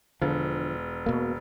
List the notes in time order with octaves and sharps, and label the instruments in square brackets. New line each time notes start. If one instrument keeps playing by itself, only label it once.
[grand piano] E1 [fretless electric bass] D3 F3
[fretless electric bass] B2 A#3